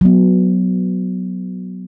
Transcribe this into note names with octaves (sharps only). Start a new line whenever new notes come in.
F#3 B3